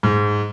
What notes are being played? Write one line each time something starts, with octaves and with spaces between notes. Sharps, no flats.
G#2